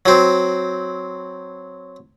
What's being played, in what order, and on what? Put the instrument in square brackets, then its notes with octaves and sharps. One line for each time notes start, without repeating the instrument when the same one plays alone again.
[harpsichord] F#3 C4